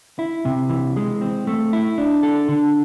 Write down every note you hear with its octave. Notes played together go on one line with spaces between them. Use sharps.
E4
C3
E3
G#3
C4
A3
E4
D4
A4
D3